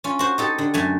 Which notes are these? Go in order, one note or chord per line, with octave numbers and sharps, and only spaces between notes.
C#4 F4
F#4 C5
D#4 G4 A4
D3
F#2 A3 G#5